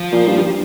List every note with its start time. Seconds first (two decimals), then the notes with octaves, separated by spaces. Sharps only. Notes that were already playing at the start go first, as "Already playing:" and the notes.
Already playing: F3
0.12 A#2
0.27 G2
0.37 G2